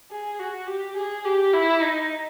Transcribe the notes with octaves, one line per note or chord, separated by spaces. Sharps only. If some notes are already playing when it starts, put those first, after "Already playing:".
G#4
F#4
G4
G#4
G4
E4
D#4